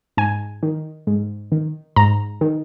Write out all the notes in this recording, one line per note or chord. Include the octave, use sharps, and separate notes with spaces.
G#2 G#5
D#3
G#2
D#3
G#2 A#5
D#3